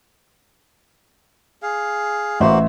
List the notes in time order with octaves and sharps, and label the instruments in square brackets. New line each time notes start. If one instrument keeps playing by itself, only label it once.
[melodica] G#4 F5
[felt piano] A1 E5 C6 [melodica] A#3 F#4 C5